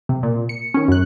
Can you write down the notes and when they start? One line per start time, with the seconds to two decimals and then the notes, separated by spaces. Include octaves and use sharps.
0.09 C3
0.23 A#2
0.49 C#7
0.74 D#3 C#4
0.88 F#2 F#6